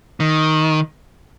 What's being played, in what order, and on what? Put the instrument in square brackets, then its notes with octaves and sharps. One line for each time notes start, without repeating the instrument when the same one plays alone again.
[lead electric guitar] D#3